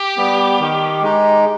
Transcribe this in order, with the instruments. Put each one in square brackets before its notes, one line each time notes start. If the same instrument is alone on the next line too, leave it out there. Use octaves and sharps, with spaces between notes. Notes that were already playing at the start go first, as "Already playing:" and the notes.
Already playing: [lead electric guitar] G4
[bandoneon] G3 B3
D#3
G#3 D#4